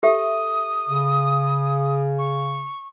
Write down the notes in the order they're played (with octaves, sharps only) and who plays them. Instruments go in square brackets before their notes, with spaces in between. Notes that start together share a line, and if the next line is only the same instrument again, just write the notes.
[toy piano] G4 A4 E5 [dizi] D#6
[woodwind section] C#3
[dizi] C#6